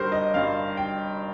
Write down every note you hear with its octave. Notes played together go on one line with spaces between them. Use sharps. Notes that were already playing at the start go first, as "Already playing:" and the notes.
Already playing: G1 G2 G3 G4 A#4 C5
D#5
G1 G2 G3 F5
G5